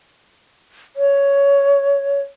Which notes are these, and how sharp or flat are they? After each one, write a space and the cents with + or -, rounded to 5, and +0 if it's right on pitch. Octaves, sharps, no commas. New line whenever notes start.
C#5 +10